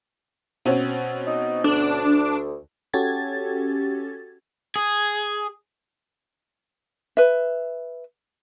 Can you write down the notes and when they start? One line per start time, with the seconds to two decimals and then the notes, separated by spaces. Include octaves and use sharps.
0.65 B2 C4 C#4
1.27 D#4
1.64 D2 D4
2.94 C#4 F#4 G4 A4 G#6 A6
4.76 G#4
7.17 B4 E5